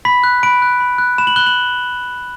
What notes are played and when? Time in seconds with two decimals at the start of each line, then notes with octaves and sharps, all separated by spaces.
0.05 B5 B6
0.24 F#6
0.43 B5 D7
0.62 F#6
0.80 B5
0.98 F#6
1.18 B5 E7
1.27 F#7
1.36 F#6 G7
1.47 F#7